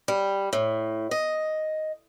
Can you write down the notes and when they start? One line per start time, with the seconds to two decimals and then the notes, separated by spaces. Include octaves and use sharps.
0.08 G3
0.53 A2
1.11 D#5